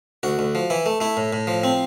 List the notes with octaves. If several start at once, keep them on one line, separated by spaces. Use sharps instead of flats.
D2 F#4
D2
F3
E3 E4
A3
A3 E4
A2
A2
F3
C4